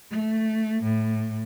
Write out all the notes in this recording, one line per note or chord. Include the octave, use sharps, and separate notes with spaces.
A3
A2